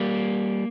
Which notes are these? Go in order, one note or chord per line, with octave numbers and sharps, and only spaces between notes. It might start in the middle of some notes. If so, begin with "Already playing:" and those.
Already playing: G3 A#3